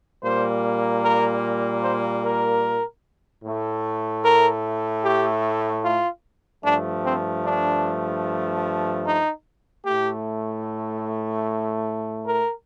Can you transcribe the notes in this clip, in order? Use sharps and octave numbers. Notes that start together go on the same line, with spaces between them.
A#2 G3 A#3 C5
A#4
C5
A#4
A2 A3
A#4
G4
F4
G2 F3 A3 D4
C4
D4
D#4
A2 A3 G4
A#4